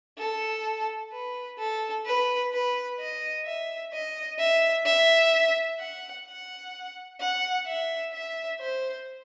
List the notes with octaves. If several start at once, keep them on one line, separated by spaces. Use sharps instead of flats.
A4
B4
A4
B4
B4
D#5
E5
D#5
E5
E5
F#5
F#5
F#5
E5
E5
C5